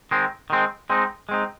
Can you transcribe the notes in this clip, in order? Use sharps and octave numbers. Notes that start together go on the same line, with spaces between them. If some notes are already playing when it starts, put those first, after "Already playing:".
D#3 G#3 C4
D#3 G#3 C4
G#3 C4 D#4
G#3 C4 D#4